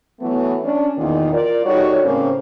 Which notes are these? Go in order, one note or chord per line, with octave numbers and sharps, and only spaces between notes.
E3 F#3 A3 B3
C#4 D4
E2 A#2 D#3
F4 A#4 D5
G3 D#4 F#4 A4 C#5
A2 C#3 A#3 C4 C#4 C5